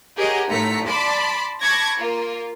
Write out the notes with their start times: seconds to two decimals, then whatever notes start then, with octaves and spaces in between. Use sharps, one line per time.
0.17 G4 G#4 A#4 C#5 D#5 F#5
0.49 B1 A2 A3 A#5 B6 C#7
0.87 D5 A5 B5 C6 D6
1.61 A5 B5 C#6 D6 G#6 A#6
1.98 A#3 F4